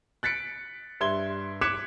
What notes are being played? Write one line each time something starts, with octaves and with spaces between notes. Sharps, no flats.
F#6 A6 B6 C#7 D7
G2 E5 C6 G#6 G7
D6 F#6 G#6 B6 C#7 E7